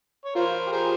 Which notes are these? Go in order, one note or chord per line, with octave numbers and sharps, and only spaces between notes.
C#5
F4 A#4 C5
G4
G#4 A#4 C5